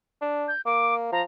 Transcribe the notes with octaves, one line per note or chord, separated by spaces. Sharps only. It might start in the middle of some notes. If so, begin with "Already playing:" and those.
D4
G6
A#3 D6
F3 A#5